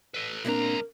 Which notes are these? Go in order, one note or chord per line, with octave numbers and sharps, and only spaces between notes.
A4 B4
C#2 A#2 C4 D4 A#4 A#5